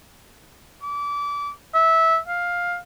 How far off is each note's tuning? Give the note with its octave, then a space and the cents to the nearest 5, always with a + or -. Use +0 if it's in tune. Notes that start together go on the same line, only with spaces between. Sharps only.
D6 -25
E5 -15
F5 +10